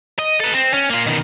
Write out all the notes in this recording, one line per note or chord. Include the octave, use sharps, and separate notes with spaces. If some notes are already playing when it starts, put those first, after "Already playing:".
D#5
A4 B4
C4
C#4
A#3 F4
B2 D#3